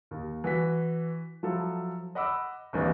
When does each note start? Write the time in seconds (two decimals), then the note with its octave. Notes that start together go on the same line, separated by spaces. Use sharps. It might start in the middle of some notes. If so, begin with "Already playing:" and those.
0.11 D#2
0.44 E3 F#4 B6
1.43 F3 F#3 E4 A4
2.15 D#5 F#5 B5 D6 E6
2.73 G#1 D#2 D3 E3 D4 F5